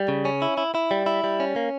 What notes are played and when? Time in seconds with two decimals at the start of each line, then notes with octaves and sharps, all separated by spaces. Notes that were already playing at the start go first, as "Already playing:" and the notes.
Already playing: G3
0.08 C#3
0.25 C#4
0.42 E4
0.57 E4
0.75 E4
0.91 G3
1.06 E4
1.24 G3
1.40 C#4
1.56 A#3